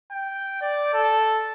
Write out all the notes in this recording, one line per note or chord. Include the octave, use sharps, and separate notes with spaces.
G5
D5
A4